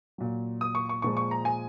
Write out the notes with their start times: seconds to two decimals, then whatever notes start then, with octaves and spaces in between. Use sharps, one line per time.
0.18 A#2 F#3
0.61 D#6
0.75 C#6
0.89 C#6
1.02 A#2 F3 G#3 C#6
1.17 C#6
1.31 A#5
1.45 G#5